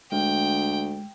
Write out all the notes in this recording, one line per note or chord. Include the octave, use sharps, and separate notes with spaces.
D2 G#3 G5